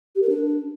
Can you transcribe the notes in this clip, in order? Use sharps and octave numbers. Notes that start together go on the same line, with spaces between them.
G4
A#4
D4